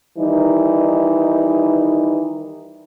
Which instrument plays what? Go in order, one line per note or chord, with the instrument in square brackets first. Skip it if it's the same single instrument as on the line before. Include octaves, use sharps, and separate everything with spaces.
[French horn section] D#3 E3 G3 D#4